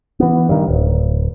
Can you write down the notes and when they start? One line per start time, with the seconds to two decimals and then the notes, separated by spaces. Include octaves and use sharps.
0.20 E3 B3
0.49 G2 D#3
0.68 D1